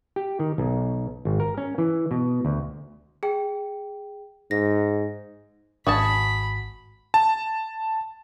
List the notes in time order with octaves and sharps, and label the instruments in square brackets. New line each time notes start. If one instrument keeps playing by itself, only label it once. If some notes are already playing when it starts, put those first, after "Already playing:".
[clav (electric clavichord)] G4
D#3
B1
G#1
A#4
C#4
E3
B2
D2
[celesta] G#4 G5
[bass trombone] G#2 [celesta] A#6
[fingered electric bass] G#1 [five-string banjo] F#4 G#4 A5 [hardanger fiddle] B5
[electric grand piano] A5